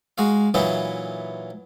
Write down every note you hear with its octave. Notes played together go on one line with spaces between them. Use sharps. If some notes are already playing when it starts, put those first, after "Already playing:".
G#3 F#4 F5
A#2 E3 F#3 D#4 E4